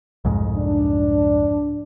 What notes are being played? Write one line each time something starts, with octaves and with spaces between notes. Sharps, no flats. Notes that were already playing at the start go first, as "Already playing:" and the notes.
C2 F2 G#2
D4